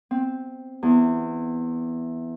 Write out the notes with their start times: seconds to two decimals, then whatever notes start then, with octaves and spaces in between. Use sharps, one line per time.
0.11 C4
0.83 E2